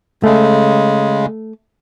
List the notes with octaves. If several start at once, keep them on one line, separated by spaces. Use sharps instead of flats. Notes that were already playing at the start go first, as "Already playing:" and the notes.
C#3 G#3 A3